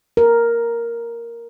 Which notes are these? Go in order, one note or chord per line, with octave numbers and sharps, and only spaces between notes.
A#4